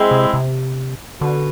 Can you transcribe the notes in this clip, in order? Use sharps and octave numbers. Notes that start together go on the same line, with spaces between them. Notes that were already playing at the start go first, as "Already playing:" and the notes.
Already playing: G#3 C4 E4
C3
C3
B2 D3